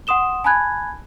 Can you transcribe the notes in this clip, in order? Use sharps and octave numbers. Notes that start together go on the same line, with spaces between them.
F#5 C6 D#6 E7 G7
G#5 A5 B5 F#6 G#6